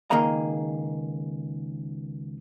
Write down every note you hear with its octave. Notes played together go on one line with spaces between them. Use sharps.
C#2 D#3 A#3 G#4 D#5 A#5